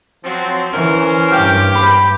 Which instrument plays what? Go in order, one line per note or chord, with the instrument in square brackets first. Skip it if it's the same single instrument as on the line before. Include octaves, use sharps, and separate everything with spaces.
[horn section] F3 F#3 C4
[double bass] E3 [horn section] C#4 A#4 C5
[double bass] G2 [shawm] G4 [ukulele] G5
[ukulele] C5 B5